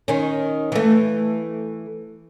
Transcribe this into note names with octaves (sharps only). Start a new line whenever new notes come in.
D#3 C#4
E3 A3